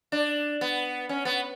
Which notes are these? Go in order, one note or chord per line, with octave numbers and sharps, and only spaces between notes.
D4
B3
C#4
B3